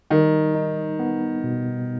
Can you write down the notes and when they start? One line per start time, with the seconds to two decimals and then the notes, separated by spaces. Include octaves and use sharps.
0.10 D#3 G3
0.55 D#4
0.99 B3
1.44 B2